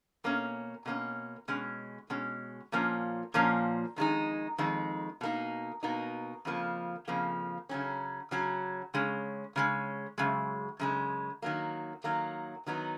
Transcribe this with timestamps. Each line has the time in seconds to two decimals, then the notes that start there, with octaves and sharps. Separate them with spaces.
0.24 B2 A#3 C#4
0.86 B2 A#3 C#4
1.48 B2 G#3 C#4
2.10 B2 G#3 C#4
2.72 A#2 F3 A#3 C#4
3.34 A#2 F3 A#3 C#4
3.96 F2 D#3 G#3 D#4
4.58 F2 D#3 G#3 D#4
5.21 B2 A#3 D#4
5.83 B2 A#3 D#4
6.45 F2 C#3 F3 A#3
7.08 F2 C#3 F3 A#3
7.69 C#3 F#3 C#4
8.31 C#3 F#3 C#4
8.94 C#3 G#3 C#4
9.56 C#3 G#3 C#4
10.18 F#2 C#3 G#3
10.80 F#2 C#3 G#3
11.42 D#3 F#3 A#3
12.04 D#3 F#3 A#3
12.66 D#3 F#3 B3 D#4